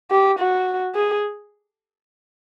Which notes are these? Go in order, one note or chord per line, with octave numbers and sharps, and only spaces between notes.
G4
F#4
G#4